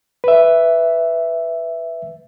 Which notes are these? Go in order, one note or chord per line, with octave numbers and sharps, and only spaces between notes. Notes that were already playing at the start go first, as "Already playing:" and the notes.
B4 E5